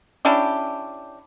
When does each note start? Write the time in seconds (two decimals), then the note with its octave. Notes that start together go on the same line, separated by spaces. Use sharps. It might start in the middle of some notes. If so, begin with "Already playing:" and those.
0.25 C#4 D4 E4 G4